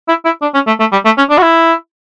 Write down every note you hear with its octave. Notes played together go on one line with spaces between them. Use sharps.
E4
E4
D4
C#4
A3
A3
G3
A3
C#4
D4
F#4
E4